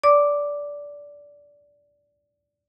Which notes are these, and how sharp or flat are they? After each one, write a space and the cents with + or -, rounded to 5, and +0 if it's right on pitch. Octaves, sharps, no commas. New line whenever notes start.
D5 -15 D6 +0